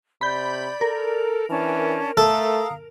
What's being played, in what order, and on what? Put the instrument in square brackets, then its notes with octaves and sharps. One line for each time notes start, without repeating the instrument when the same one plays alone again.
[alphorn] C3 [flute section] D5 [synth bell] B5 G6
[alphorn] A4 [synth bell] A#4
[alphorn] E3 [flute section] C#4 D4 A5
[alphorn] A3 [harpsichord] A4 [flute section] F5 A#5 D#6